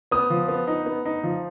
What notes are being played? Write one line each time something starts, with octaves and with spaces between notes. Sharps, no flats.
B3 D#6
F3
B3
D#4
B3
D#4
F3